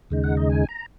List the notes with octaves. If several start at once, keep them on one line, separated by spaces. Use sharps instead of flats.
D#2 C#3 G#3 D#4
F#5
D#5
G#5
A#5